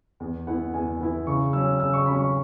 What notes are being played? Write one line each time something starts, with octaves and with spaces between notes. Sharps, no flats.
E2
E3 B3 E4 F#5
E2 G#5
E3 B3 E4
C#3 C#6
F#3 C#4 E6
C#3 E6
C#6
F#3 C#4 B5
C#6